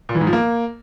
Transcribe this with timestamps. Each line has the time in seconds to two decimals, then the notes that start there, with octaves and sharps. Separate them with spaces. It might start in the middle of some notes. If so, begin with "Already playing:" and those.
0.09 A#2
0.15 E3
0.21 G#2
0.27 F3
0.33 A#3